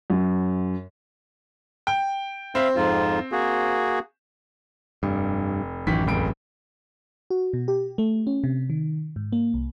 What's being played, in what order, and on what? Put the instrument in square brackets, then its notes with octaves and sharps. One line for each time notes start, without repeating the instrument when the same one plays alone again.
[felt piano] F#2
[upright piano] G5
[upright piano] C4 [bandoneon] E5 F5 B5
[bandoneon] F2 G#2 F4
A#3 F#4 G#4
[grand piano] F1 [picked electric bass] G2
[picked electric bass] A1 F#2 [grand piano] D#3 E3 B6
[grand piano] F1 C#2 D7
[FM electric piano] F#4
B2
G4
A3
C#4
C3
D#3
G#2
A#3
C2